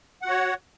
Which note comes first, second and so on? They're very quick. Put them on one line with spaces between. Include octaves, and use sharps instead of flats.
F#5 F#4 C#5